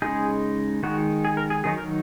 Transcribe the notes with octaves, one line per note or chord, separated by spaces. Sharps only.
C#3 G#3 D#4 G#4
D#3 G#3 D#4 F#4
G#4
A#4
G#4
D#3 F#3 D#4 G#4
A#4